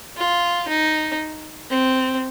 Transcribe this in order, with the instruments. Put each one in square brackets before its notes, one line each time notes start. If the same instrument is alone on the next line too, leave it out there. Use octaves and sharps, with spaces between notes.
[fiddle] F4
D#4
C4